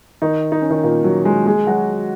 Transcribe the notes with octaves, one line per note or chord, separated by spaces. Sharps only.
D#3 D#4
D#4
C#4
D#3 D#4
A#2 A#3
F#3
G#3
G#3 G#4
F#3 F#4